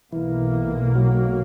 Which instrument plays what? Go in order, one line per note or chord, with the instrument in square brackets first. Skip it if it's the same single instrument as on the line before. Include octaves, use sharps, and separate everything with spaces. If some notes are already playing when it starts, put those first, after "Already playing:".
[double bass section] B1 B2 A#3 [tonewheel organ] E3
[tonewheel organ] F#3